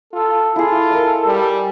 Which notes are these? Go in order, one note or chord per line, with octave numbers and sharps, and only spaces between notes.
F4 A4
E4 F4 G#4 A4
A#4 D#5
G3